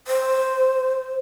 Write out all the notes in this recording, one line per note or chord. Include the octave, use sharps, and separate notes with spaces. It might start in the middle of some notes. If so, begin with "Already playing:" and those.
C5